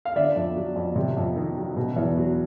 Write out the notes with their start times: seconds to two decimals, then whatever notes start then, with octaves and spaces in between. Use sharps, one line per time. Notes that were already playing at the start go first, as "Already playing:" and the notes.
0.05 F5
0.16 D3 D5 E5
0.36 F2
0.56 F#3
0.76 F2
0.96 C3
1.17 F2
1.36 D#3
1.57 F#3
1.76 B2
1.96 E2
2.17 F#3